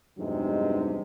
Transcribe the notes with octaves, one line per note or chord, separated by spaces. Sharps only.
E2 G2 C3 F#3 G#3 D#4